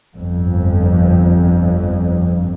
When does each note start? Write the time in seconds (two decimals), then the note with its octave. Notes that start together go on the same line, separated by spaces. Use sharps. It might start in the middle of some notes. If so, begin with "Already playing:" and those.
0.15 G1 F2